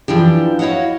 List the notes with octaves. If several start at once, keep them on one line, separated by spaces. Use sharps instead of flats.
E3 F3 D4 G4
E4 F#4 C#5 D#5 F5 F#5